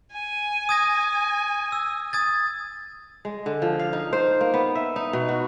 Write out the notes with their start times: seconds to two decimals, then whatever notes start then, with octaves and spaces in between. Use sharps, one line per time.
0.13 G#5
0.69 D#6 G#6 A#6
1.72 E6
2.13 D#6 G#6 A6
3.25 G#3
3.46 D3
3.62 F3
3.79 F5
3.93 D#4
4.13 C5
4.41 A#3
4.54 B3
4.75 E5
4.96 D#4
5.13 B2
5.29 F#4